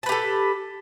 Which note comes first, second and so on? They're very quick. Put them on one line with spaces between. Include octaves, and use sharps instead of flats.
A5 B4 G4 A4